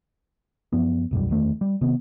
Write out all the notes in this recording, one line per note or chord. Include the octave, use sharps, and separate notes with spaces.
F#2 F3 B3
E1 B1 F#2 G3
F#1 E2 D#3 A3
G3
C3 D#3 B3